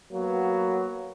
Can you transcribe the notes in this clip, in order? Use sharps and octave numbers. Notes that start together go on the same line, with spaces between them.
F#3 A#3 B3